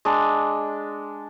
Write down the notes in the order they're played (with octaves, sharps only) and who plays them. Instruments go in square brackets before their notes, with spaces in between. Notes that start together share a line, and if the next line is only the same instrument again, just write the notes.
[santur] G#3 D4